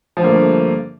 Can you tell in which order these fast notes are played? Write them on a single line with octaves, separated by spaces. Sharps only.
F3 D3 A#3 G2 A3